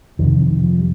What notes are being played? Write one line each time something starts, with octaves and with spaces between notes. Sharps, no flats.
F2 C3 D#3
D#3
F3
G3